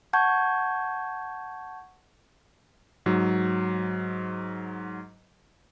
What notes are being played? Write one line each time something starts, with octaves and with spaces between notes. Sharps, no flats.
F#5 A5 C#6 G6 G#6
G#2 F#3